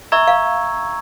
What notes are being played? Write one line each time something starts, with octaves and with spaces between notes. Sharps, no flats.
E5 A#5 C#6 E6 G#6
F5